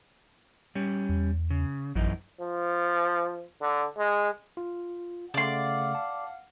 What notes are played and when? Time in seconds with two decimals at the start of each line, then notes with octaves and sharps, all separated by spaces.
0.75 G3 C#4
1.09 E2
1.50 C#3
1.95 A1 F#2 E3 D#4
2.41 F3
3.61 D3
3.98 G#3
4.57 F4
5.34 C#3 A3 D5 F5 F#5 C6
5.95 A5